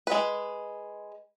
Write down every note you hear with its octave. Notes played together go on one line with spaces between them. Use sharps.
G#3 B4